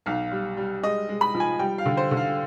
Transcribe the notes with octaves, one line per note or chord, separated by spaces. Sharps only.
B1 F5
G3
G3
G#3 D#5
G#3
B5
F3
G#5
G3 G5
F5
D3
C5
D3
F5